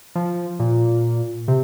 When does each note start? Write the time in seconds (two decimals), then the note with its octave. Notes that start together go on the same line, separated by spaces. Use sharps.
0.15 F3
0.60 A#2
1.48 C3